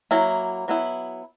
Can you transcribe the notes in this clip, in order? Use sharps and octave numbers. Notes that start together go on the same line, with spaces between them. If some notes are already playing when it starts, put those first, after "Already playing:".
F#3 A#3 E4
F#3 B3 E4